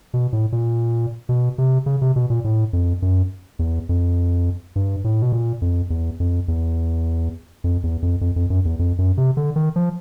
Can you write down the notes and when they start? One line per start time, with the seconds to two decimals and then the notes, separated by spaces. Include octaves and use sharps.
0.14 B2
0.33 A2
0.52 A#2
1.29 B2
1.58 C3
1.86 C#3
2.02 C3
2.16 B2
2.30 A#2
2.44 A2
2.73 F2
3.02 F#2
3.59 E2
3.89 F2
4.76 G2
5.04 A2
5.22 B2
5.32 A#2
5.62 F2
5.90 E2
6.20 F2
6.48 E2
7.64 F2
7.84 E2
8.02 F2
8.21 F2
8.36 F2
8.50 F#2
8.65 E2
8.79 F2
8.98 F#2
9.17 C3
9.37 D3
9.56 D#3
9.76 F3